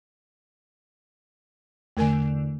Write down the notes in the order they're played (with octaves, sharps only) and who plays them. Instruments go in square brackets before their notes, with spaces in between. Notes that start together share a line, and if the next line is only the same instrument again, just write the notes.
[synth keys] E2 D3 [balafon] A3 A#4 G#5